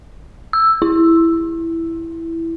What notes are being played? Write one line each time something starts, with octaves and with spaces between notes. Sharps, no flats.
E6
E4